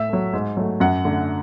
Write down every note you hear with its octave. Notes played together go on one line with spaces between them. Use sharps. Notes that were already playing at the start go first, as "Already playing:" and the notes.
Already playing: A2 E5
F#3 A3
G#2
F#3 A3
F#2 F#5
D3 A3